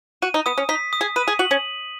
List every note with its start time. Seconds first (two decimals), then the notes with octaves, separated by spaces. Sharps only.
0.22 F#4 D#7
0.34 D#4
0.46 B3 D#6
0.58 C#4
0.69 D#4 B6
0.93 D#6
1.01 G#4
1.16 B4 D#7
1.28 G#4
1.39 F#4 F#7
1.51 C#4